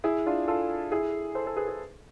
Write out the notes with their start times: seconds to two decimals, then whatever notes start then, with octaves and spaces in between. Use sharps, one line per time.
0.04 E4 G#4
0.26 D4 F4
0.48 F4 A4
0.92 E4 G#4
1.35 A4 C5
1.46 A4 C5
1.57 G#4 B4
1.68 G#4 B4